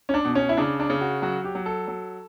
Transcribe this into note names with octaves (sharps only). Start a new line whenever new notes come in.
C#4
D4
B2
C#4
E4
C#3 D4
D4
C#3
F#4
F#3 F#4
G4
F#3
A4
F#3